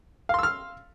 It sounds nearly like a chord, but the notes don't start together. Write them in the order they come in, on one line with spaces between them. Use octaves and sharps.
F5 C6 E6 F6